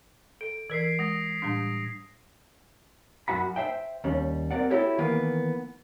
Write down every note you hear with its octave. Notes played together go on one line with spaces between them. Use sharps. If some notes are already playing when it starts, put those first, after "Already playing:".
A4 D7
E3 A#4 G#6 B6 C7
G#3 D#6 A#6
A2 G3 D4
F#2 F#4 F#5 B5
C5 E5 G5
D#2 G3 C#4
C4 A#4 D5 F#5
E4 F#4 G4 A4 C#5
D#3 E3 A#3 B3